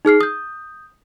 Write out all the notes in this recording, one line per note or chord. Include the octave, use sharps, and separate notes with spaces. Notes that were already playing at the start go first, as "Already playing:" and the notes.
D#4 G#4 F6 C7
D#6 G6